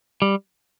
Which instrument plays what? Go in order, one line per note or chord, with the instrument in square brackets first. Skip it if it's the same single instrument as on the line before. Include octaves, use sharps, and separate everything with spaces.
[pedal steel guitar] G3